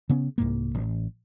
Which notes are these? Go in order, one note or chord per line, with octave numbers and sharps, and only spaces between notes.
C#3 B3 C#4
C2 G#2 A#3
A1